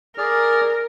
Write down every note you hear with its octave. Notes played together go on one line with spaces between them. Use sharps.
G#4 A#4 D5 F6